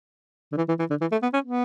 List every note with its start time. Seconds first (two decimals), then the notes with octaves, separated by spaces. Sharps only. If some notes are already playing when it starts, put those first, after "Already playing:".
0.52 D3
0.57 E3
0.69 E3
0.79 E3
0.90 D3
1.01 E3
1.12 A3
1.23 B3
1.34 C#4
1.45 B3